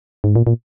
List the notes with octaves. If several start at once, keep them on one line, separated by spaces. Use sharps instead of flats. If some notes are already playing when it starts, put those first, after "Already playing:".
G#2
A#2
A#2